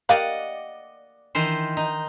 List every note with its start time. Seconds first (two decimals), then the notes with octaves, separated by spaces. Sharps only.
0.09 A#3 G4 D5 D#5 F5 F#5
1.35 D#3 E3 C5
1.77 D#4